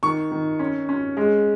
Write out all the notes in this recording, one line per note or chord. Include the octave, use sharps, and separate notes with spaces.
D#3 C#6
D#3
C#4
C#4
G#3